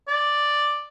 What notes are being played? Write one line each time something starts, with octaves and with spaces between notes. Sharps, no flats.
D5